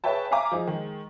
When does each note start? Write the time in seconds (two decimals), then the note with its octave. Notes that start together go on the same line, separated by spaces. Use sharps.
0.04 G#4 B4 C#5 E5 G5 A5
0.31 E5 F5 G#5 A#5 D6
0.52 F3 D#4 G#4
0.67 D#3 G#3